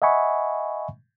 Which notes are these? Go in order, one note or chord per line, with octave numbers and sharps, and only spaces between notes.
D#5 E5 F#5 G#5 B5 C#6